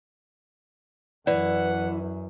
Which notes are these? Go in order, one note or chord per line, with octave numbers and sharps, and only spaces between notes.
F#2 E3 D5 F#5